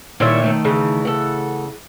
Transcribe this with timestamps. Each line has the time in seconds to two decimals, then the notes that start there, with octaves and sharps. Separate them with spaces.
0.20 A#2 D#3 G3 E4 C#5 E5
0.42 D#3 A3 D#4
0.65 C#3 E3
1.05 A4 F#5